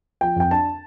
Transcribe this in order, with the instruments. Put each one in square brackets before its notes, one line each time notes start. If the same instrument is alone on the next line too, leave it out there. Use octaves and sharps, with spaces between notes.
[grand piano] F3 G5
F2 G5
D4 A5